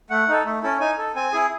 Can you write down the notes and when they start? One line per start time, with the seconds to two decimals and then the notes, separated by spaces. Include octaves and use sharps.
0.10 A3 F#5
0.28 D#4 A4
0.45 A3
0.63 C#4 E4 A4
0.80 D#4 G#5
0.98 A4
1.15 C4 G#5
1.32 E4 G#4